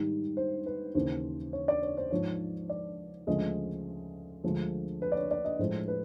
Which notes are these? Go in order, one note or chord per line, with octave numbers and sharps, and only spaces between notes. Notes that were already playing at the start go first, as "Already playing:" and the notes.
Already playing: G#2 D#3 G3
C5
B4
D#2 C#3 E3 C5
C#5
D5
C#5
C5
G#2 F3 G#3 C#5
D5
D2 C#3 F3 G#3 D#5
D2 D3 F3 G#3
B4
D5
C#5
D5
D#5
A2 F3 G#3 C5
B4